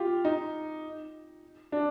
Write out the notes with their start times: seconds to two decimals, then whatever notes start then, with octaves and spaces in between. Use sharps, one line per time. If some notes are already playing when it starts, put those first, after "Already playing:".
Already playing: F4 G4
0.25 D#4
1.72 D4